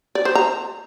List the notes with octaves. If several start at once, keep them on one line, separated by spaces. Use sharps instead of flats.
D5
C5
A#5